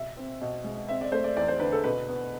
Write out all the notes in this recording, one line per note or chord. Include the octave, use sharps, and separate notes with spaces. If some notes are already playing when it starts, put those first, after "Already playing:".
Already playing: B2 E5
C4
B2
G#3
C4 E5
D5
A3 C5
D5
E2 D5
C5
D3 B4
A4
B2 B4
B3